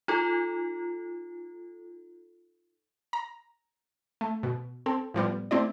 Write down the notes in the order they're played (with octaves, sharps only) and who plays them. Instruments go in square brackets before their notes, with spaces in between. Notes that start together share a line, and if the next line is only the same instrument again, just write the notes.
[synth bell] D#4 F4 A4
[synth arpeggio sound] A#5
A3
B2
C4 A4
A2 F3 G3 B3
A3 C4 E4 D5